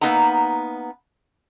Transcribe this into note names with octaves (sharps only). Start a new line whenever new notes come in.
A#3 B3 D#4 F#5 A#5